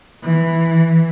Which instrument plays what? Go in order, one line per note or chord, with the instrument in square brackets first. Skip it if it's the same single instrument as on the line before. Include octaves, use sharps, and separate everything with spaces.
[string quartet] E3